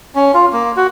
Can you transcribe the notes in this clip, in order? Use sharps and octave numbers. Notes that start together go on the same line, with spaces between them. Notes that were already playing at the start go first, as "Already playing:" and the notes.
C#4
F4
A#3
F#4